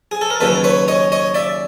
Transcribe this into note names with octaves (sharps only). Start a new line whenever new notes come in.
G#4
A4
A#4
D#2 C#3 F#3 A4 B4
B4 C#5
C#5 D#5
C#5 D#5
D5 E5